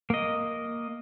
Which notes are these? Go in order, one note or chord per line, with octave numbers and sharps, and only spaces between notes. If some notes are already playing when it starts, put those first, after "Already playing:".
A#3 D#5